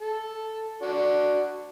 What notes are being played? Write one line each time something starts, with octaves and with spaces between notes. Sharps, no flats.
A4
D4 F#4